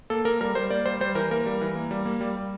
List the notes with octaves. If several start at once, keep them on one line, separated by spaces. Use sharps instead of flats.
A#3 A4
A#3 A#4
G3 A#4
G3 C5
A#3 D5
G3 C5
G3 C5
E3 A#4
A#3 A#4
G3
E3
A#3
G3
A#3
G3
G3